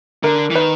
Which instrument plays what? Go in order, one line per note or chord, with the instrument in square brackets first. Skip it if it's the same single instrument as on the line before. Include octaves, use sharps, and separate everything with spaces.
[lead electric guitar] D3 [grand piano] A#4
[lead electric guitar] E3
[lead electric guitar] D#3 [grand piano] B4